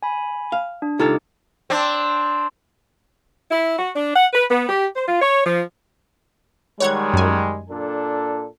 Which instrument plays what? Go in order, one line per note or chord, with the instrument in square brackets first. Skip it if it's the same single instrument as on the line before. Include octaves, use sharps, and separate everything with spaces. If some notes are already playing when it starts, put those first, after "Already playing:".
[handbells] G#5 B5
[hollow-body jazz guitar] F5
[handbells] D4
[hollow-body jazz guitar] C#2 F4 A4 [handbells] D#4 G4
[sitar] C4 D4
[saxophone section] E4
F#4
D4
F#5
B4
B3
G4
C5
F4
C#5
F3
[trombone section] D#3 G3 G#3 [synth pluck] C#5 F#5 G#6
[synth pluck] F#2 G#5
[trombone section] A#2 D4 A4